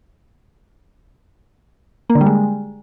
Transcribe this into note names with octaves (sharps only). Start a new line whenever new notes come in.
A#3
D3
G3
G#3